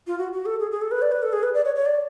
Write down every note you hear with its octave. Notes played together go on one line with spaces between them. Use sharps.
F4
F#4
F#4
A4
G#4
G#4
A4
B4
D5
B4
A4
G#4
B4
D5
C#5
C#5
D5